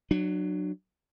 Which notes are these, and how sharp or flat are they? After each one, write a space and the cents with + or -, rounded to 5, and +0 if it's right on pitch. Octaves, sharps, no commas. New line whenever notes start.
F#3 +0 D4 +35